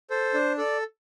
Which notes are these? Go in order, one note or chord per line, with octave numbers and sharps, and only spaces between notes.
A4 C5
D4
A4 D5